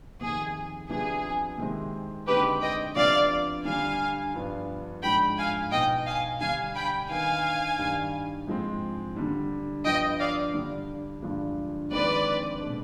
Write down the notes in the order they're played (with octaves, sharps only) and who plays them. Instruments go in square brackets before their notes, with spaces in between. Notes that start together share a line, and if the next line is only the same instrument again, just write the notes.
[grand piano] F2 C3 D#3 [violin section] G#4
[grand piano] C3 F3 B3 D4 [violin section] G#4
[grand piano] C3 D#3 G#3 C4
[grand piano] D3 G#3 C4 D#4 [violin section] G4 B4
[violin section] D#5 G5
[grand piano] C3 F3 B3 D4 [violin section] D5 F5
[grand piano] D3 G3 D4 [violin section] F5 G#5
[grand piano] G2 F3 B3 D4
[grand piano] G#2 F3 G#3 D4 [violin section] G5 B5
[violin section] F5 G#5
[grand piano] B2 B3 D#4 [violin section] D#5 G5
[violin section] F5 G#5
[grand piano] D3 G3 D4 [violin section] F5 G#5
[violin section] G5 B5
[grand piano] D#3 B3 D#4 [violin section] F5 G#5
[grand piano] G2 D#3 G3
G#2 F3 G#3 C4
D3 G3 D4
[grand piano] G2 F3 B3 [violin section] D#5 G5
[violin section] D5 F5
[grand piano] D3 G3 D4
G2 D3 F3 G#3 D4
[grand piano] F2 D#3 G#3 C4 D#4 [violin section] B4 D5
[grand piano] B2 G#3 D4